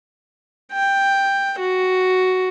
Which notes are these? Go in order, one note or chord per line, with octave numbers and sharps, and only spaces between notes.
G5
F#4